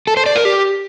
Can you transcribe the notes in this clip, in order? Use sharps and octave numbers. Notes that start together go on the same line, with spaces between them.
A4
C5
D5
A#4
G4